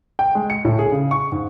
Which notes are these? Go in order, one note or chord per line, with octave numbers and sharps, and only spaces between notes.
G5
G#3
C#7
A2
G#4
C#3
C#6
G#2